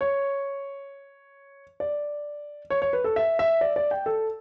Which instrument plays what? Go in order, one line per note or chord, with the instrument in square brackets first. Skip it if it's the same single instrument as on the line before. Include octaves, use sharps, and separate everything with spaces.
[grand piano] C#5
D5
C#5
C#5
B4
A4
E5
E5
D5
D5
G5
A4